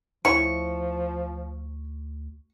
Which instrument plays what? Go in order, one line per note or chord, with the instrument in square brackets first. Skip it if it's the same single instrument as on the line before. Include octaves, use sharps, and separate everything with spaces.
[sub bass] D2 [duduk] F3 [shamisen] E4 C#5 [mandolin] C#6